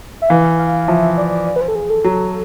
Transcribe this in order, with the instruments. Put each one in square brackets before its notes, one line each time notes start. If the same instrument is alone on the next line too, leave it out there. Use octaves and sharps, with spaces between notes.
[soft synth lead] E5
[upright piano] E3 [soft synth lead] F5
[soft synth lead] F5
[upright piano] F3 [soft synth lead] E5
[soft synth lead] D5
D5
B4
C5
A4
G#4
A4
[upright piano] F#3